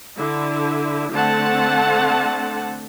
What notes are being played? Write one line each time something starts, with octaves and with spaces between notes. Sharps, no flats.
D3 E4
D3 A3 C4 F#5 A5